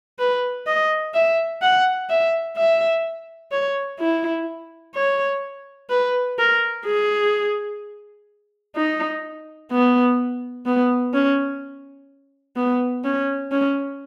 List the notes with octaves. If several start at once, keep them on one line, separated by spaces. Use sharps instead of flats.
B4
D#5
E5
F#5
E5
E5
C#5
E4
C#5
B4
A#4
G#4
D#4
B3
B3
C#4
B3
C#4
C#4